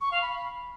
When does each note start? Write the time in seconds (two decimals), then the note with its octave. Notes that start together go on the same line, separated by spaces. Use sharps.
0.01 C#6
0.11 F5
0.22 B5